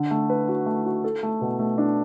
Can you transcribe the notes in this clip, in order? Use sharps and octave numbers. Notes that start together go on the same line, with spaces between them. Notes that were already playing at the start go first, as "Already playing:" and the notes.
Already playing: D3
A3
B4
F#4
A3
F#4
A4
A3
B2
A3
D4